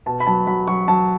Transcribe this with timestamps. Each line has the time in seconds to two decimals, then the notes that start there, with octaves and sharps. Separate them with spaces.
0.06 B2 A5
0.20 B5
0.27 F#3 A5
0.47 F#3 B5
0.67 F#3 C#6
0.88 F#3 A5